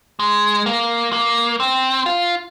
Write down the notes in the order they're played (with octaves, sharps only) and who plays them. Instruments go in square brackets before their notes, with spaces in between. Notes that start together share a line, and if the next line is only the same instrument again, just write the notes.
[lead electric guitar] G#3
A#3
A#3
C4
F4